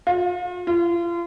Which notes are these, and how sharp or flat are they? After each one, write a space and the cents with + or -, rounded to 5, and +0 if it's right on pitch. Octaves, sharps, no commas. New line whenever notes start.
F4 +40
F4 -35